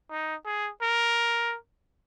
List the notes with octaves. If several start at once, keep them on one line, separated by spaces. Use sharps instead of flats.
D#4
G#4
A#4